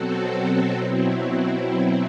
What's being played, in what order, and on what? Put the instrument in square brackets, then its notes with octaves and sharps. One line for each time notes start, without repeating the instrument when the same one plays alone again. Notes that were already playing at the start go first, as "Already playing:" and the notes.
Already playing: [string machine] B2 F#3 C4 F#4 A4
B2 F#3 C4 E4